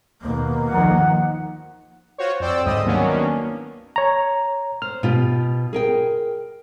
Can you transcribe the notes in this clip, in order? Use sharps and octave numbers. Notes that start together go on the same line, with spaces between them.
D#2 B2 A#3
D#3 F3 F#5
F4 F#4 C5 C#5
F2 C4 C5 D5 G5 E6
D2 G#2 G3 D#5 D#6 E6
D#3 F#3 A#3 B3 C#4 D4
C#5 A#5
C5 F6
B2 F4 G4
G#4 A#4 G5